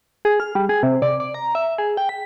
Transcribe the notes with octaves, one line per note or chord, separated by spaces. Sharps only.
G#4
F6
G3
G#4
C3
D5
D5
A#5
E5
G#4
G5
B6